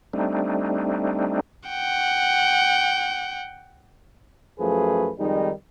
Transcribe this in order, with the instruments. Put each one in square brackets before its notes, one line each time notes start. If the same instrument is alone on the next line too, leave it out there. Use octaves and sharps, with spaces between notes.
[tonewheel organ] G3 A3 C4 D4 D#4
[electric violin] F#5 G5
[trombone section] F#2 F3 A3 G#4 B4
F2 D#3 G3 G#3 D#4